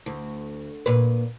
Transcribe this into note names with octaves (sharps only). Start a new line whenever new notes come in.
D2
A#2 B4